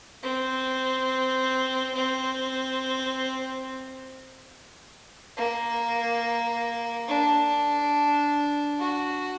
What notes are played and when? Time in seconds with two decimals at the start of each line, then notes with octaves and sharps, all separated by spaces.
0.23 C4
1.95 C4
5.37 A#3
7.08 D4
8.80 F#4